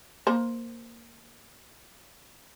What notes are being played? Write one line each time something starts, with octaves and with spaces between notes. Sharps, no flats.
A#3 C5